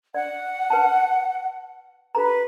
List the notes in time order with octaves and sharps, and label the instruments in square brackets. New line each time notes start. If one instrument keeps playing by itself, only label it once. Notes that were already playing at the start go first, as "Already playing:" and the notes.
[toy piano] D5 [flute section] F#5
[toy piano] B4 A5
[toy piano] G4 A4 A#5 [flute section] B4